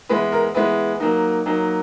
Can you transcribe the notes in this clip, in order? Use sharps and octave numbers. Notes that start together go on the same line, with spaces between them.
E3 G#3 B3 E4 B4
A#4
E3 G#3 B3 E4 B4
F#3 A#3 D#4
F#3 A#3 D#4